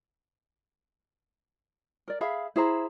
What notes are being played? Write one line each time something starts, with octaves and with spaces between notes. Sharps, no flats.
A#4 D5
G#4 E5 F5 B5
E4 G#4 C5 A#5